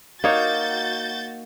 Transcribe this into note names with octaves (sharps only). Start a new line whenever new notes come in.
A#3 D#4 F#4 C#5 G6 A6